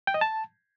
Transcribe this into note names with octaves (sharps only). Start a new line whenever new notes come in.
G5
D#5
A5